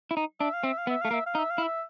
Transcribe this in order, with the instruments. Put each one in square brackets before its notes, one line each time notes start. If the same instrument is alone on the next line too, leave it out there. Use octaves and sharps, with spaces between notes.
[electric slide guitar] E4
D#4
[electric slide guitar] D4 [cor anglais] E5
[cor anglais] F5
[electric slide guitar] C4 [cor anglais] E5
[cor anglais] F5
[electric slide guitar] B3
[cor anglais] E5
[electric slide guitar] A3 [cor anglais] F5
[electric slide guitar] A#3
[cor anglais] E5
F5
[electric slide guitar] D#4
[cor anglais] E5
F5
[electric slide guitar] E4
[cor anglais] E5